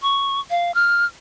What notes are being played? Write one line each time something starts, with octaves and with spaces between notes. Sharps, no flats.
C#6
F5
F6